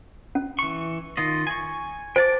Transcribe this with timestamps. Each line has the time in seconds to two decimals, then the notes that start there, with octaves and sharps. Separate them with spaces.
0.35 C#4
0.59 E3 C#6
1.17 D#3 F4 D#5
1.47 G#5 C#6
2.16 C5 G5 A5 D6